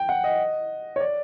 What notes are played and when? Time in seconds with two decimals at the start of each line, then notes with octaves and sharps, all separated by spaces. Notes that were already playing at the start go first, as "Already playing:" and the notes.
Already playing: G5
0.09 F#5
0.24 D#5
0.96 C#5
1.00 D5